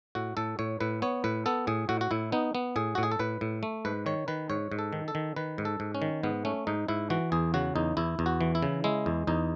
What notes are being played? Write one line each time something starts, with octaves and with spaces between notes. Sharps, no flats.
A2 F#4
A2 A4
A2 C#5
A2 B4
B3 C#5
A2 B4
B3 A4
A2 G#4
A2 F#4
F#4
A2 E4
B3 D#4
B3
A2 G#4
A2 F#4
G#4
A4
A2 B4
A2
A3
G#2 B4
D#3 C#5
D#3 B4
G#2 C#5
G#2
A4
D#3
A4
D#3
D#3 B4
G#2
A4
G#2
C#4
D#3
G#2 B3
A3 C#4
G#2 D#4
G#2 E4
E3 F#4
E2 G#4
C#3 F#4
E2 D#4
E2 E4
E2
F#4
E3
E4
C#3
G#3 E4
E2
E2 D#4